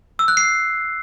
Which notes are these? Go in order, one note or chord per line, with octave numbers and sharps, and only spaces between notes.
E6
F#6
C7